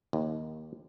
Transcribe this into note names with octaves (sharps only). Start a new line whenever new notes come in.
D#2